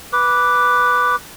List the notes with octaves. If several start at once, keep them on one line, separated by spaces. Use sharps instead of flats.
B4 D6